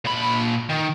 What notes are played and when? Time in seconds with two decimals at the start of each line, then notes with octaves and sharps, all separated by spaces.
0.05 A#2 B5
0.69 D#3